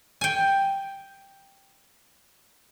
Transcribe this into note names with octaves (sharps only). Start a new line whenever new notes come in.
G5 G#5